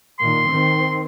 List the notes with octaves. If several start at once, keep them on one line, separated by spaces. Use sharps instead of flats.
A#2 D#3 C6
D#3 C4